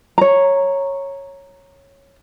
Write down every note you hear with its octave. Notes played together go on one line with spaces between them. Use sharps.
C#5 A#5